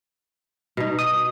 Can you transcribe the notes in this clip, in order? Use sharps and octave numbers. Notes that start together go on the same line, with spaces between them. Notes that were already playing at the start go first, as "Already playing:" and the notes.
B2 D#4
D#6